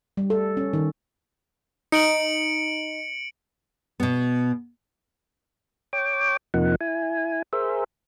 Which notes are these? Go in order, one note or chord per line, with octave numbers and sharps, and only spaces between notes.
G3
A4
C#4
D#3
D#4 C#7 D7 F#7
B2 B3
C#5 G5 D6
F2 C3 F3 A#3 D#4 F#5
E4 G#5
G#4 A#4 C5 E5